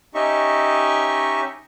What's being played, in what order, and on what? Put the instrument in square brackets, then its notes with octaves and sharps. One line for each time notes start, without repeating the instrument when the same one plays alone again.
[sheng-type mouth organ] C#4 D#4 G4 D#5 E5 C#6